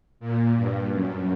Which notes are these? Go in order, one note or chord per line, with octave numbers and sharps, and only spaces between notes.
A#2
G2
F#2